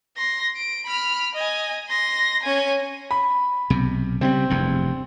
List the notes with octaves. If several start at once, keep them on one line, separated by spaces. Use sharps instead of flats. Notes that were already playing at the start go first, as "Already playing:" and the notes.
C6 A#6
D7
B5 F6
D#5 G#5
C6 A#6
C#4 G#5
B5
B1 C3
C#3 F#3 G3 C4
F1 E2 G2